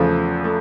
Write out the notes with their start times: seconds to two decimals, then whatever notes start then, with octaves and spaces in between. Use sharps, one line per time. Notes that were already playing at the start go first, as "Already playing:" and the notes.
Already playing: E2 C#3 F3 A3
0.44 A3